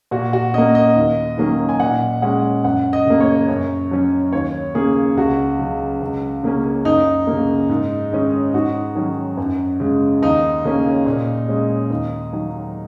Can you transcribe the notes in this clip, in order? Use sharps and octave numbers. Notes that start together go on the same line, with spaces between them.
A#2 F#4
F#4
A#3 C#4 D#5
D#5
D#2
D#3 F#3 A#3 C#4
G#5
A#2 F#5
G#3 C#4 F#5
F#2 F#5
D#5
C#3 A#3
C#5
F#2
F#3 C#4
D#2 C#5
C#3 A#3 C#4 G#4
C#2 F#4
C#3 F#3
C#2
C#3 A#3 C#4
F#2 D#4
C#3 A#3
G#2
D#3 G#3 C#4
G#2 F#4
D#3 F#3 C#4
F#2
C#3 G#3
D#2 D#4
C#3 A#3 C#4
A#2
G#3 C#4
D#2
D#3 F#3